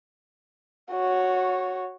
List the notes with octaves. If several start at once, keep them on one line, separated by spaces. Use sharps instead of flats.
F#4 C#5